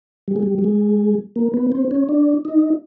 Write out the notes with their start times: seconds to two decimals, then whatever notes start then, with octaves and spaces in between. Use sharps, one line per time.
0.28 G3
0.36 G#3
0.43 G3
0.59 G3
0.64 G#3
1.36 A#3
1.54 B3
1.72 C4
1.91 C#4
2.09 D4
2.45 D#4